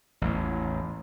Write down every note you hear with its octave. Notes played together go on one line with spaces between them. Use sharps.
A1 E2